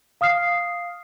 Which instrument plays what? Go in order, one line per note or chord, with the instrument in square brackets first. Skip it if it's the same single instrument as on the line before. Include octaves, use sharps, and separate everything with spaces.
[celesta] F5 D#6 F6 C7